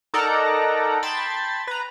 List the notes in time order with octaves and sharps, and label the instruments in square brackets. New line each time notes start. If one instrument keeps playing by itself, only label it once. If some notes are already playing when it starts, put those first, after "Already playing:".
[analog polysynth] D#4 A4 A#4 D5 F#5 A#5
G5 A5 B5 C6 G#6 A6
B4 A#5